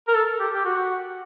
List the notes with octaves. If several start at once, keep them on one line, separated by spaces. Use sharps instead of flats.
A#4
A4
G4
G4
F#4